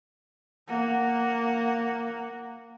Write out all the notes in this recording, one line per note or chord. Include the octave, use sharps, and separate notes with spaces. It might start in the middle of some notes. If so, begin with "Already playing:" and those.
A#3 F#5